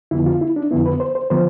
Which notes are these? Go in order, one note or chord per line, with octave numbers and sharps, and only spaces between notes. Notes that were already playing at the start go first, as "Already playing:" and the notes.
F2 D3 F3 B3 E4
F4
E4
D4
F2 D3 F3 B3 E4
B4
C5
C5
D3 F3 B3 C5